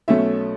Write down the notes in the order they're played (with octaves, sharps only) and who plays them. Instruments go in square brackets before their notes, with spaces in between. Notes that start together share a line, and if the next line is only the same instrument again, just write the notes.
[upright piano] B1 B2 A3 C#4 E5